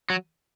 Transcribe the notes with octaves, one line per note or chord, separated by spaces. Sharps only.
F#3